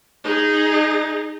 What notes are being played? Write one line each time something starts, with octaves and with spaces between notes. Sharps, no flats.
D#4 G#4